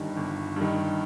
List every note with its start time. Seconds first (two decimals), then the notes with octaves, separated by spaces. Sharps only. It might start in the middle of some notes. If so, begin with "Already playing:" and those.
Already playing: G1 G2 D#3
0.17 G1
0.56 G2 D#3